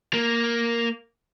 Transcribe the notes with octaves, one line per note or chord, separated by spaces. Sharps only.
A#3